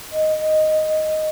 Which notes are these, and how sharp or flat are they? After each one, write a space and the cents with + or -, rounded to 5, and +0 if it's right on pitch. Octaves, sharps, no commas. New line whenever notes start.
D#5 +0